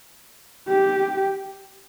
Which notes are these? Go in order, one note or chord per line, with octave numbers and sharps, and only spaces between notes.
G4